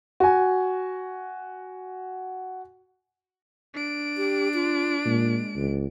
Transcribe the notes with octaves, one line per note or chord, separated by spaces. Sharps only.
F#4 G#5
D4 D7
G4
F4
A#2 G#3
C#2